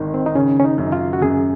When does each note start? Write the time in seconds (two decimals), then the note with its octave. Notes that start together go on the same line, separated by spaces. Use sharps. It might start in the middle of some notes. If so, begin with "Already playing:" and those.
Already playing: G#1 D#3
0.14 C4
0.26 D#4
0.35 C#3 C#4
0.60 C#4
0.64 D#4
0.78 F#2
0.92 F4
1.13 F#4
1.22 F#2 G#4